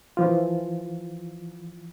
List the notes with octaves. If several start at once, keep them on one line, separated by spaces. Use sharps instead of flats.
E3 F3 F4